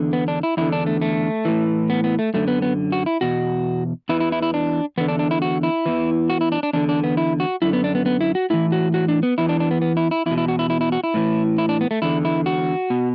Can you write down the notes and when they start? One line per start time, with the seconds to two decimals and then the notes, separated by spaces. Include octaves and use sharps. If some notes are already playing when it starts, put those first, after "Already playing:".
Already playing: E2 D3
0.13 B3
0.28 D4
0.43 E4
0.57 E2 D3 E4
0.72 D4
0.86 A3
1.02 A3
1.45 A2 E3
1.90 B3
2.04 B3
2.19 A3
2.34 F#2 D3 A3
2.48 B3
2.62 B3
2.92 F#4
3.06 E4
3.21 E2 B2 F#4
4.09 E2 E3 E4
4.20 E4
4.32 E4
4.42 E4
4.54 D4
4.98 E2 B3
5.00 D3
5.08 D4
5.19 D4
5.31 E4
5.42 F#4
5.63 E4
5.86 E2 E3
6.30 F#4
6.41 E4
6.52 D4
6.63 D4
6.73 E2 D3 D4
6.89 D4
7.04 B3
7.17 E4
7.40 F#4
7.62 F#2 D3 E4
7.73 B3
7.84 D4
7.95 B3
8.06 B3
8.21 E4
8.35 F#4
8.50 A2 E3 E4
8.72 F#4
8.94 F#4
9.08 D4
9.23 B3
9.38 E2 E3 E4
9.49 D4
9.60 D4
9.71 B3
9.82 B3
9.97 E4
10.11 E4
10.26 E2 E4
10.31 B2
10.38 E4
10.48 F#4
10.59 E4
10.70 E4
10.81 E4
10.92 F#4
11.04 E4
11.14 A2 E3
11.58 E4
11.69 D4
11.81 B3
11.91 A3
12.02 E2 D3 E4
12.25 E4
12.46 F#4
12.90 B2